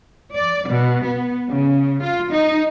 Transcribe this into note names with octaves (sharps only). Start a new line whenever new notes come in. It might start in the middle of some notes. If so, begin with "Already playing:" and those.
D5
B2
B3
C#3
F4
D#4